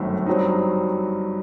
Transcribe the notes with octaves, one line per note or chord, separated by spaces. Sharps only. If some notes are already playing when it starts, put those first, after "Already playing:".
Already playing: G1 F#2 D#3 A3 C4
G2 F#3 C4 D#4